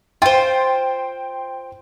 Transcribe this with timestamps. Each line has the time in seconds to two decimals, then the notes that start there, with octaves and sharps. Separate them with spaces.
0.22 F4 C5 G5